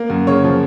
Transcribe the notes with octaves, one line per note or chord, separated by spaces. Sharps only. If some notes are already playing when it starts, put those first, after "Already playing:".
Already playing: A#3
F#2
C#3 C#5
F3